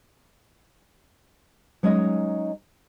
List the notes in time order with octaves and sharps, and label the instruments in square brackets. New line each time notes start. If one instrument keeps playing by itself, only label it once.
[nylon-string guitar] F#3 G#3 C#4 D#4 D#5